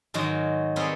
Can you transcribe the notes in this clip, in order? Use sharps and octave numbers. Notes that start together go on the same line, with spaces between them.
G#2 D#3 F#3 G#3 F#4
G3 B3 C4 G#4 A#4 C#5